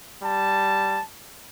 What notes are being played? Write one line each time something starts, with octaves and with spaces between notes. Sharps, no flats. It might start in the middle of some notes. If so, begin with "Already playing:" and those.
G3 A5